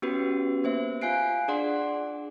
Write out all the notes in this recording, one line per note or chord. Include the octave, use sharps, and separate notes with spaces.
B3 C#4 F#4 G4 B4
A#3 C5 E5
F4 F5 G#5 F#6 C7 D7
D4 G#4 D5 F#5 C6